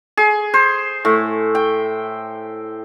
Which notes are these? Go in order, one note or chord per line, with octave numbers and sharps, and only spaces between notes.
G#4
C5
A2
G5